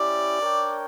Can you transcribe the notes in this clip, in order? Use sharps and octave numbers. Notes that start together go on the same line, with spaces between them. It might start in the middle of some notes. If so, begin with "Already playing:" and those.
Already playing: C#4 E4 G4 D5
D4 A#4 C#5 G5